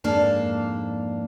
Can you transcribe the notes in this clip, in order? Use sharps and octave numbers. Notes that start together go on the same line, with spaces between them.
F2 G#2 A#3 D4 A5